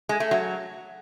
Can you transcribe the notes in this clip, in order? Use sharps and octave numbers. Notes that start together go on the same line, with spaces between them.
G#3
A3
F#3